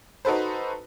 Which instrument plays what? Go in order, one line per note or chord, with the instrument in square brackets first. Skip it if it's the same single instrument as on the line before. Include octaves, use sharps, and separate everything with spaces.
[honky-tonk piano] D#4 F#4 A4 B4 C5